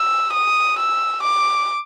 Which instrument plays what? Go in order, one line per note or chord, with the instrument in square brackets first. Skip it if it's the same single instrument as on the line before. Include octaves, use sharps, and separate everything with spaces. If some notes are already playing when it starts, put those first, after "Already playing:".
Already playing: [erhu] E6
D#6
E6
D6